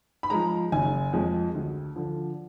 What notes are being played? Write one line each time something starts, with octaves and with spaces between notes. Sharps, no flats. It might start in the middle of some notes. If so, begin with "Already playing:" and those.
B5
F3 G#3 A#5
F#1 G#5
F2 F3 G#3
D2
D3 F3